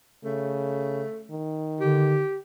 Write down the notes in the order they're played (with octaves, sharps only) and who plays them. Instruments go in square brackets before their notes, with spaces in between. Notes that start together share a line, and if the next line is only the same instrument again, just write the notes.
[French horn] C#3 [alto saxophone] A3
[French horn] D#3
[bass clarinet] D3 [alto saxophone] G4